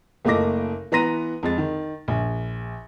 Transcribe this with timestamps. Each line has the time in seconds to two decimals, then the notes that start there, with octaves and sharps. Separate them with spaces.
0.25 F#1 A3 A#3 D#5 D6 A#6
0.92 E3 B3 A#5 C6 A#6 D#7
1.43 F2 G#3 A6
1.58 D#3
2.08 A#1